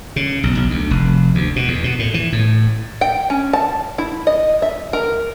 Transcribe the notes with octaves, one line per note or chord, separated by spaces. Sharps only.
C#3
B1
B1
D2
F1
D2
B2
E2
B2
A2
E3
A2
G5
C#4
A5
E4
D#5
E5
A#4